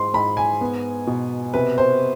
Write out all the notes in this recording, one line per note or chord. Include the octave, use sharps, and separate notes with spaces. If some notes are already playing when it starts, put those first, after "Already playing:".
Already playing: G#2 C6
G#2 B5
G#5
B3
B2
C3 B4
C5